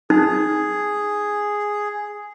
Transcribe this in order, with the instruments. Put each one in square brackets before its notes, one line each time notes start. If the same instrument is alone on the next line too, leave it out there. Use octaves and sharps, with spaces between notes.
[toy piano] D#4 [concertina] G#4